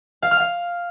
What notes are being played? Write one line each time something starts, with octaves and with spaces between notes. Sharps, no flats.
F5
F6
F5